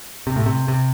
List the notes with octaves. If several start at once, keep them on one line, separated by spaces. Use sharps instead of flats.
C3
A2
C3
C3